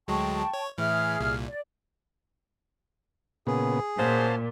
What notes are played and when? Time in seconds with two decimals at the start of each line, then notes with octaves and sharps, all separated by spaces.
0.08 D2 F#3 G#3 G5 A5 C#6
0.54 C#5
0.78 A2 E3 G#4 E5 F6
1.21 C2 A#2
1.48 D5
3.47 A#2 C#3 B3 G#4
3.99 A#2 C#4 F#4 C5 F5 A5